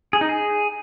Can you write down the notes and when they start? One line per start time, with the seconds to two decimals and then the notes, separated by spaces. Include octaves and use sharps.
0.13 G#4
0.21 D#4
0.29 G#4